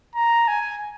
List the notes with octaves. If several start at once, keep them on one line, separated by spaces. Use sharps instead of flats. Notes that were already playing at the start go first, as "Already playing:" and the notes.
A#5
G#5